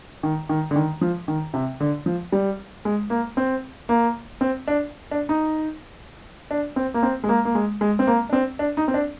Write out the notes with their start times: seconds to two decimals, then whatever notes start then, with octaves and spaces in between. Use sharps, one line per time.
0.23 D#3
0.49 D#3
0.71 D3
0.76 D#3
1.01 F3
1.28 D#3
1.54 C3
1.80 D3
2.06 F3
2.32 G3
2.85 G#3
3.10 A#3
3.37 C4
3.89 A#3
4.41 C4
4.68 D4
5.11 D4
5.29 D#4
6.51 D4
6.76 C4
6.94 A#3
7.03 C4
7.24 G#3
7.29 A#3
7.45 A#3
7.55 G#3
7.81 G#3
7.99 C4
8.07 A#3
8.29 D4
8.33 C4
8.59 D4
8.77 D#4
8.88 C4
8.94 D4